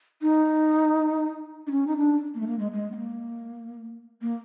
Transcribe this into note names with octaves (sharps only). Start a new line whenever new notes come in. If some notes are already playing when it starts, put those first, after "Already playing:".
D#4
D4
C#4
D#4
D4
A#3
A3
A#3
G#3
G#3
B3
A#3
A#3